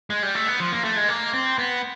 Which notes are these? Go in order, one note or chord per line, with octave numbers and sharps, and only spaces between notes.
G#3
G3
A3
B3
F3
A#3
A3
G#3
A#3
C4
B3